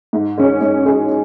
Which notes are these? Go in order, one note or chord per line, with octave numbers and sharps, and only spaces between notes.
G#2
G#3 C#4 G#4
G#2
G#3 C#4 G#4